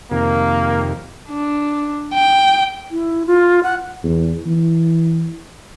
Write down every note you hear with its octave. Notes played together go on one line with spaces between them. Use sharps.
F2 C3 D#3 A#3
D4
G5
E4
F4
F#5
E2
E3